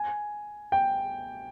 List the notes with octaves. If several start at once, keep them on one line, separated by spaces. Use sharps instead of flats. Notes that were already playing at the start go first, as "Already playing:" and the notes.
Already playing: G#5
G5